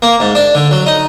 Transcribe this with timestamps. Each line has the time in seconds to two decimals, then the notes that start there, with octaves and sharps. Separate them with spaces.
0.02 A#3
0.20 G#2
0.35 D4
0.55 D3
0.71 F#3
0.86 D#4